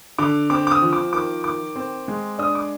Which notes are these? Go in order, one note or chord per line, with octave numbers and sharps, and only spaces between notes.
D3 D6
C4 D6
D6
D#6
F3
D6
D#3 D6
D#3 D6
C4
G#3
D4 D#6
D6